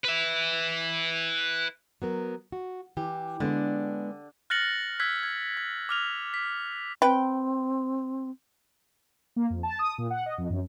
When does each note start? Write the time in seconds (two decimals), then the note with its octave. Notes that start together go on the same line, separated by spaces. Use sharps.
0.05 B4 E5
2.02 F#3 B3 A#4
2.52 F#4
2.97 E3 G4
3.40 D3 G#3 B3 D4
4.50 F6 F#6 A6 A#6 C#7 F#7
5.00 E6 F#6 G#6 B6
5.23 G#6
5.57 G#6
5.89 D6 F6 F7
6.34 B6
7.02 C4 B4 G5
9.36 A#3
9.50 F2
9.63 A5
9.79 D#6
9.98 A#2
10.10 F#5
10.26 D#5
10.38 F2
10.50 F#2